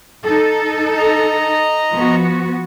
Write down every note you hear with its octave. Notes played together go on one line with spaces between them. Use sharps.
D#4 A4
D#5 A#5
F3 B3 F#4